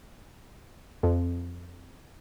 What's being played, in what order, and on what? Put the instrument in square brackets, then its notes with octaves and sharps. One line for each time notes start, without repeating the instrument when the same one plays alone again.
[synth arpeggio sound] F2